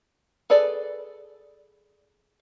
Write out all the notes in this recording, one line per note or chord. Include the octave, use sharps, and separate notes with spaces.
G#4 A4 B4 D5